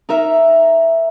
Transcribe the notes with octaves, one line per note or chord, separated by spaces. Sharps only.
D#4 A#4 E5